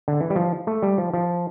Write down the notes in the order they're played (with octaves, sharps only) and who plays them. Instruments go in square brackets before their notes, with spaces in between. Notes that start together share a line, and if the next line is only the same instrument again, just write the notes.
[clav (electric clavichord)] D3
E3
G3
F3
A3
G3
F3
F3